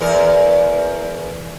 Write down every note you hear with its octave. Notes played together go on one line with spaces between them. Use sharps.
E2 A#4